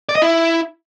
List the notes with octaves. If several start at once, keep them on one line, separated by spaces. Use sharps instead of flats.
D5
D#5
E4